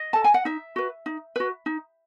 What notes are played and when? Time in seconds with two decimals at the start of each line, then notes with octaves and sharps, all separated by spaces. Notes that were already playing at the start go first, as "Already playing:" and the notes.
Already playing: D#5
0.13 A4 A5
0.24 G#5
0.34 F#5
0.45 D#4 E5
0.76 F#4 B4
1.06 D#4
1.36 F#4 B4
1.66 D#4